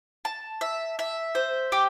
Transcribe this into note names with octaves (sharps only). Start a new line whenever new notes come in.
A5
E5
E5
C5
G4